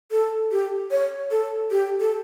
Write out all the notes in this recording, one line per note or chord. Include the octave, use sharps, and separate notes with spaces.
A4
G4
C#5
A4
G4
A4